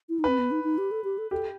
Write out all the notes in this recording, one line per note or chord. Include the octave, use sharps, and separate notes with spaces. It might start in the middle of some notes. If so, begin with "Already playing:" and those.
E4
D#4
C4 B4
B3
D#4
D#4
G4
A4
G4
A4
G4 A4